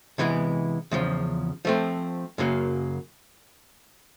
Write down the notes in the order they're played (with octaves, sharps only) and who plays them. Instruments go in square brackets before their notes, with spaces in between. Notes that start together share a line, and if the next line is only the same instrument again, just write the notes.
[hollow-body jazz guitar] C3 E3 G#3 B3 E4
E2 C#3 F3
F3 A3 C4
F#2 C#3 F#3 A#3